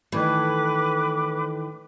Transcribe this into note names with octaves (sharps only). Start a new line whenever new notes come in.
A2 D#3 E3 A3 B4 D6